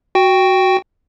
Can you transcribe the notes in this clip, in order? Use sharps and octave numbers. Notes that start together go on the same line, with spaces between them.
F#4 G5